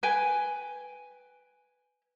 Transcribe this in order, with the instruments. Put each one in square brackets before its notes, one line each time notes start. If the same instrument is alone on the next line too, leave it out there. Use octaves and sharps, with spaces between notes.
[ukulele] B4 G5 G#5